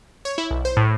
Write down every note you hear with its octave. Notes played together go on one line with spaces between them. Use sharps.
C#5
E4
B1
C5
A2